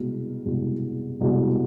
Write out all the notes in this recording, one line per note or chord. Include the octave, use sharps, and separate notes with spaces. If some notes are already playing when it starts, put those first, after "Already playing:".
Already playing: C2 B2 G#3
C2 B2 G#3
C2 B2 G#3